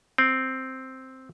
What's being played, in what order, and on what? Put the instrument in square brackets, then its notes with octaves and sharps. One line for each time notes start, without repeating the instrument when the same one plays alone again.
[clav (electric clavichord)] C4